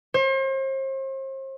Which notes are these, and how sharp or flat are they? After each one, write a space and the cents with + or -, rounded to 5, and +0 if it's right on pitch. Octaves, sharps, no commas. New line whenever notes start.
C5 +40